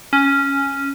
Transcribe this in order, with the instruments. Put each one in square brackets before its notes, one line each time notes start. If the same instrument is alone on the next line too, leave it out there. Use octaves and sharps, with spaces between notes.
[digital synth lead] C#4